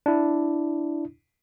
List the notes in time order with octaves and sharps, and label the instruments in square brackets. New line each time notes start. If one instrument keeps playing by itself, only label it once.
[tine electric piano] D4 E4